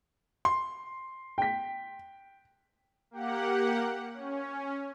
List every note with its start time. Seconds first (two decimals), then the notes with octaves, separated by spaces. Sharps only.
0.45 C6
1.38 G5 B6
3.11 A#3 G4 F#5
4.14 C#4